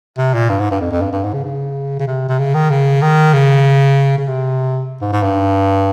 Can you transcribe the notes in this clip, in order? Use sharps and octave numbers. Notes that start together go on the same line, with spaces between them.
C3
A#2
G2
G#2
G2
F2
F2
G2
G2
G#2
C#3
C#3
C#3
C3
C3
C#3
D#3
C#3
D#3
C#3
C#3
C3
G#2
G#2
G2